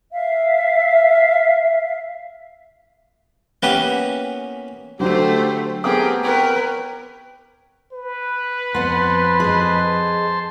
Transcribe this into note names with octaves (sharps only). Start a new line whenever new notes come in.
E5 F5
E3 A#3 B3 C#4 G4 B4
D3 F#3 A3 G4 C5
A3 B3 C4 G4 G#4 A#4 F#5 D6
C4 A#4 B4 C#5 G5
B4
F2 B3 C5 F#5 A5 C6
G#4 D#5